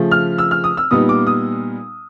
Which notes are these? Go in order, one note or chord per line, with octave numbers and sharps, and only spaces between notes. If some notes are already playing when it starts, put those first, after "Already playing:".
Already playing: C#3 F3 A3
F6
E6
F6
D#6
E6
A#2 G3 B3 D#4 D#6
D6
D#6